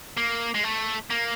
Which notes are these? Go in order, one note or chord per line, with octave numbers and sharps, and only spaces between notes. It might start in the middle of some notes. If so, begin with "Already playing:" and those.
A#3
G#3
A3
A#3